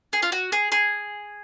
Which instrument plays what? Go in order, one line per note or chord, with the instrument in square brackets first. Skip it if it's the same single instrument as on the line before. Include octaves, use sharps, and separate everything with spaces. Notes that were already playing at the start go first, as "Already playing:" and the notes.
[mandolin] G#4
F4
F#4
G#4
G#4